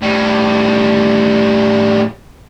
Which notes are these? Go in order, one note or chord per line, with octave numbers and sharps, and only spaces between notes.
A2 G3